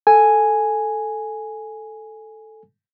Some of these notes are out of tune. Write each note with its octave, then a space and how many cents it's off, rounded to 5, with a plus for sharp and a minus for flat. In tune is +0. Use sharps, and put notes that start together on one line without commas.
A4 +0 G#5 +0